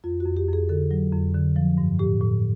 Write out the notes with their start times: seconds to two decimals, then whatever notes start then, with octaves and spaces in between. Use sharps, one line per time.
0.04 F2 F4
0.20 F#4
0.26 F2
0.37 G4
0.48 F2
0.53 G#4
0.69 D3 A4
0.91 F#3
1.12 F2
1.35 D3
1.56 F3
1.78 G2
1.99 A2 G4
2.21 A2